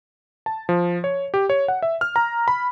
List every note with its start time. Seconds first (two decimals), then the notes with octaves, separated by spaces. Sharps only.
0.46 A5
0.69 F3
1.04 C#5
1.34 G4
1.50 C#5
1.68 F#5
1.82 E5
2.01 F6
2.16 A#5
2.48 B5